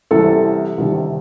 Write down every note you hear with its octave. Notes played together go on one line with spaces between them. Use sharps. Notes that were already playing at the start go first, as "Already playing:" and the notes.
C2 C3 E3 A4
C2 C3 D#3